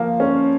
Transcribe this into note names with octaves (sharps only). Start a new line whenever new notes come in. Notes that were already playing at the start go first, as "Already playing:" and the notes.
Already playing: F3 A#3
C#4